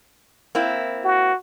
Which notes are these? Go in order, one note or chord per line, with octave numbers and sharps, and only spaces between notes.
A#3 C4 E4
F#4